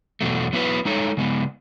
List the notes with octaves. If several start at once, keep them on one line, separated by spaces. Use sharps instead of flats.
E2 B2 F#3 A3
F#3 B3 E4 B4
G#3 D#4 A4 C#5
C#3 G#3 B3